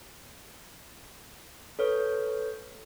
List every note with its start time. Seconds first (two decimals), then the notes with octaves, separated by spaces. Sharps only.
1.79 A4 B4 C#5 F6